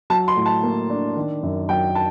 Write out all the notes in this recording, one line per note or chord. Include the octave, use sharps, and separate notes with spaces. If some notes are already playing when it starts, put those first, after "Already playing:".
F#3 A5
C6
A2
A5
A#3
D4
D#3
F#2
F#3 G5
A5